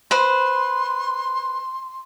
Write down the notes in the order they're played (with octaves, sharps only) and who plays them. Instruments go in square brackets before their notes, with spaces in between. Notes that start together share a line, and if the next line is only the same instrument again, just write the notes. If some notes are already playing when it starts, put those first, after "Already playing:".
[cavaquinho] B4 C5 [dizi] C6